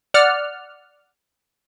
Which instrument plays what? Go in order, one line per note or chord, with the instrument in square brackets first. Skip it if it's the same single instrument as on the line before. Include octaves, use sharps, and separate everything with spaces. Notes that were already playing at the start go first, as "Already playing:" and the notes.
[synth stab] D5 F#5 F6